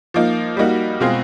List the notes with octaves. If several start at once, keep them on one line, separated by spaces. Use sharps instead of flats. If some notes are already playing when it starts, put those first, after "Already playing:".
F3 A#3 D#4
G3 A#3 D#4 F#4
B2 G#3 C4 F4 G#4